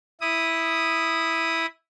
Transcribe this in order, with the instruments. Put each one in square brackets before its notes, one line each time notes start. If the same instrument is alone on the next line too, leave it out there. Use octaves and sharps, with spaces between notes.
[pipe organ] E4 D#6